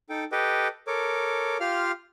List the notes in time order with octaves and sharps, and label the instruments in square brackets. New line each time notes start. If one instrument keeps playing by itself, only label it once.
[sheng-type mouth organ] D#4 A4 G5
G4 A4 B4 D#5 G5
A4 A#4 C#5 D6
F4 G4 F5 C6 F6